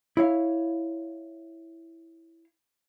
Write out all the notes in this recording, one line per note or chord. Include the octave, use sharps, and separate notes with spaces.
E4 C#5 F5